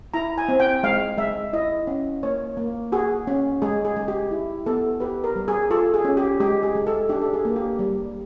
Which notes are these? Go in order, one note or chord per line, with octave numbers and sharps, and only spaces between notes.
E4 A#5
G#5
C4
G5
G#3 F5
G#3 E5
E4 D#5
C#4
A#3 C#5
A#3
F#4 G#4
C#4
G#3 G#4
G#4
G#3
G4
E4
B3 A4
G4 B4
A#4
G3
G#4
F4 A4
G#4
C#4
G4
G#3 G4
G#4
G#3
A4
D4 G4
A4
G#4
A#3
G4
G3